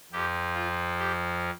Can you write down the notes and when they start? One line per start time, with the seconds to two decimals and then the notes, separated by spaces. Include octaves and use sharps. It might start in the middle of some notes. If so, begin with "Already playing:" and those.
0.12 F2 F3 G4
0.55 F4
0.99 G4